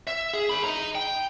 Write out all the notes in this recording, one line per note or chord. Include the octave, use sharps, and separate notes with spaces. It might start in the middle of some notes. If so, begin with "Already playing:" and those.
E5
G#4
G#4 B5
D#5 A#5
G5